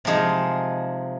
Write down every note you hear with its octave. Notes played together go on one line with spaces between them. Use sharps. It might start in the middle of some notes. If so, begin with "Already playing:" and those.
C3 F3 G#3 D#4 G#4